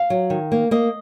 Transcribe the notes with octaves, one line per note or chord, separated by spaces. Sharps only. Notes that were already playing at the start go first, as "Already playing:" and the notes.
Already playing: F5
F#3
D#3
A#3
A#3 D#5